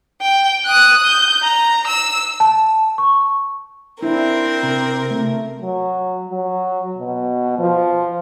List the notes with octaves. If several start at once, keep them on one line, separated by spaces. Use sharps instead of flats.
G5
D#6 F#6
G6
A#5
E6
A5
C#6
C4 D4 E4 A#4
C3
A3
F#3
F#3
B2
F3